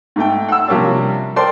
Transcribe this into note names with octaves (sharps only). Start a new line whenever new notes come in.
G#2 A3 G5
F#5 E6
C3 F3 G3 A#3 C#4 D4
A4 A#4 C5 D5 G5 C6